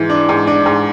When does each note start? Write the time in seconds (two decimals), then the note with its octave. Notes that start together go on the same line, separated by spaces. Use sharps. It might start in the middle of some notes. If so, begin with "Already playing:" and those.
Already playing: G#2 E3
0.10 D4
0.29 G#2
0.47 D4
0.66 G#2